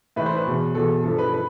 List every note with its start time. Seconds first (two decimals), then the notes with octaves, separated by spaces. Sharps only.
0.16 A2 E3 B4
0.26 C5
0.36 B4
0.47 E2 B2
0.75 E2 B2 A4
1.03 G2 F3 A4
1.18 B4
1.33 B4